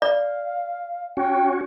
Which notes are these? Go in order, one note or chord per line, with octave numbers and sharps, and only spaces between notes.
D5 F5
C#4 F#4 G5